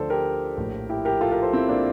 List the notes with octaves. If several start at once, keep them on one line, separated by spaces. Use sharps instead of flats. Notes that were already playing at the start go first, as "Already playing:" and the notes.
Already playing: D2 D3 F3 A4 C5 D5
G4 A#4
A#1 A2 F3
E4 G4
G4 A#4
F4 A4
G4 A#4
A4 C5
C4 E4
A#3 D4